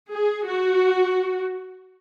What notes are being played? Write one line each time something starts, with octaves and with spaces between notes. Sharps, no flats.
G#4
F#4